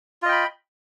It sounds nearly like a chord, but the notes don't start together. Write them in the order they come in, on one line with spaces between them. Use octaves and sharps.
F4 D#5 G5 B5